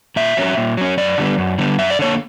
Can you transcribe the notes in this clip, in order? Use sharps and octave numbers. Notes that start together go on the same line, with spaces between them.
A#2 E5
F#3 C#4
A#2
F#3 C#4
F#2 D5
D3 G3 B3
F#2
D3 G3 B3
F#2 E5
D5
D3 A#3 C#5